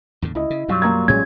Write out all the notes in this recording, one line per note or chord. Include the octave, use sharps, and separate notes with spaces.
E2 A2 D3
C#2 E4 D#5
C#3
F#2 B2 F#3 G3 F4
A#3 A#5 G#6
A1 A2 G#3 A#3 C#4 G#6